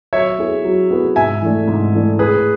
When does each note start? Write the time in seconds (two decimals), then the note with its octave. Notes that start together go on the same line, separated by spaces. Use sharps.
0.13 F#3 C#5 E5
0.38 B3 E4 G#4 B4
0.64 F#3
0.90 B3 E4 G#4 B4
1.16 G#2 E5 G#5
1.42 E3 A3 D4
1.68 G#2
1.93 E3 A3 D4
2.19 A2 G#4 B4